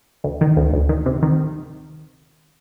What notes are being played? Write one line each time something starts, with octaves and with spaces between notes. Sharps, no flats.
D2
D#3
D2
D2
D#3
C3
D#3